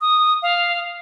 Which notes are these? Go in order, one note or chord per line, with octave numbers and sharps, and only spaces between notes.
D#6
F5